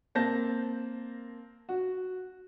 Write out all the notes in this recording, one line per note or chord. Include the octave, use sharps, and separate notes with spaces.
A#3 C4 A5 G6 A#6
F#4